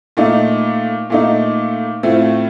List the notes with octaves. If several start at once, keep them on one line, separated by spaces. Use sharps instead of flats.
A#2 A3 D#4
A#2 A3 D#4
A2 A3 C4 F4